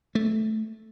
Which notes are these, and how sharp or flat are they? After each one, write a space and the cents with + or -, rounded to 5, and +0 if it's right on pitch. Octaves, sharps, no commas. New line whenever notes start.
A3 -10